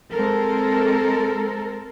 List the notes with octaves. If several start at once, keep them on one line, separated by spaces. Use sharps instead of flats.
G#3 C4 A4 A#4